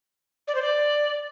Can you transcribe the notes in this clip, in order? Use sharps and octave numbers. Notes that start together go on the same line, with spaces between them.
D5
C5
D5